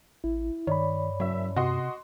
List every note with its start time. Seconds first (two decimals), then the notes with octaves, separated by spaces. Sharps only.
0.24 A1 E4
0.67 G2 D#3 C#5 D5 B5
1.20 F#1 F#3 E5
1.56 C3 F#4 D#5 C6